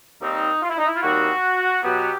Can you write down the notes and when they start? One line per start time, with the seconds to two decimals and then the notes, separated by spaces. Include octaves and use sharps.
0.21 D#2 D#3 G3 C4 D#4
0.62 F4
0.70 E4
0.78 D#4
0.86 E4
0.96 F4
1.02 D#2 D#3 G3 C4 F#4
1.82 B2 F#3 B3 G4